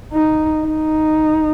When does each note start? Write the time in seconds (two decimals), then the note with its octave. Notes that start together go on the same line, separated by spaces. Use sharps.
0.13 D#4
0.66 D#4